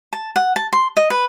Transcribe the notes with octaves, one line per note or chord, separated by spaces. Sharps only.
A5
F#5
A5
C6
D#5
B4